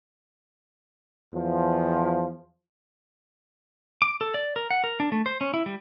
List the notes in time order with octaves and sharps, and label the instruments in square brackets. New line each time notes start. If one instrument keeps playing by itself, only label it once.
[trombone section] E2 F3
[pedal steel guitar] D6
A4
D5
A#4
F#5
A#4
D4
A3
C5
C#4
E4
G3